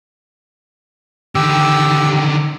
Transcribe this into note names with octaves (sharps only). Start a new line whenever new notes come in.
D3 D#3 G4 E6